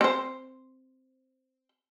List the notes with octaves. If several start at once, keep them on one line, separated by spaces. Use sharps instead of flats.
C4 C5